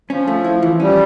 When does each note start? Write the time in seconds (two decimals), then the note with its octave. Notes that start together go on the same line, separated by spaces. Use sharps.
0.10 F3 C#4
0.28 A3
0.44 E4
0.62 E3
0.80 G3 C#4